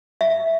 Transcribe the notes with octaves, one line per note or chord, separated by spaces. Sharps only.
E5